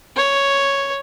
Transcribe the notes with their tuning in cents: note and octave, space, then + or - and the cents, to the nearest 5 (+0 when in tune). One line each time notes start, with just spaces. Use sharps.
C#5 +0